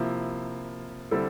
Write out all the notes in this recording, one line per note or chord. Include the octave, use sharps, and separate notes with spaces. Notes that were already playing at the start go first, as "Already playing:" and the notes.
Already playing: C3 F3 A#3 E4
D3 G3 C4 E4 A4